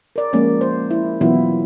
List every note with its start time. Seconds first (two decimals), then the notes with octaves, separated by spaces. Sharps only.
0.16 A#4 D5
0.33 F3 G#3 A#3 C#4
0.61 C5
0.90 E4
1.21 B2 E3 F#3 B3 E4 F4